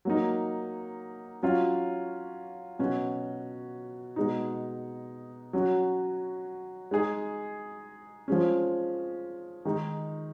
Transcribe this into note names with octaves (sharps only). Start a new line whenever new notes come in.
F#3 A#3 D#4
F#3 C#4 F4
B2 F#3 C#4 F#4
B2 G#3 D#4
F#3 C#4 F#4
G#3 D#4 G#4
F3 G#3 C#4
D#3 G#3 D#4